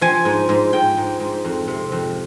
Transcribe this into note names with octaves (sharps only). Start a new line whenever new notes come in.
F3 G#5
G#2
G#2
G#2 G5
G#2
G#2
F2
C3
F2